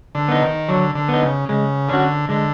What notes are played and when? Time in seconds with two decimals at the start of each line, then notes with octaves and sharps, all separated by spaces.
0.15 D3
0.28 B3 D#4
0.42 D#3
0.69 D3 F#3
0.95 D3
1.09 B3 D#4
1.23 C#3
1.49 C#3 G#3
1.89 D3 C#4 F#4
2.29 D3 G#3